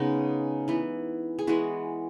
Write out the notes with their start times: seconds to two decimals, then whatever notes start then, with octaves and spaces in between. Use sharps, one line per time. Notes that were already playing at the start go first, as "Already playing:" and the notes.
Already playing: C#3 G#3 B3 C#4 D#4
0.68 E3 B3
1.39 G#4
1.47 E3 G#3 B3 F#4